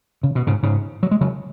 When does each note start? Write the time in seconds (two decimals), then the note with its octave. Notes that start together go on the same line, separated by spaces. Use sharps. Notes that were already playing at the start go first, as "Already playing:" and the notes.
0.23 C#3
0.35 B2
0.47 G#2 C#3
0.63 G#2 C#3
1.03 F#3
1.11 G#3
1.21 C#3 F#3